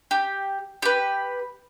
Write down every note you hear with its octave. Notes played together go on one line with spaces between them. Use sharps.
G4
G4 B4